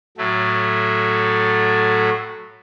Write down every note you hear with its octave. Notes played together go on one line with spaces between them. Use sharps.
A2 F#3 A3